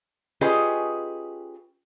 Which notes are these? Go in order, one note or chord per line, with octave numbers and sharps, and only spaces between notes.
C#4 F4 G4 G#4 B4 D#5